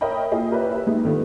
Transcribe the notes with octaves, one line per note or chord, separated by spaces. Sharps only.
A#4 C#5 D#5 E5 G5 B5
A#3 E4 F4 G#4 D#5
G4 A#4 B4 C#5 D5 E5
B4 E5
G#3 D#4 G4
D3 D#3 B3 F4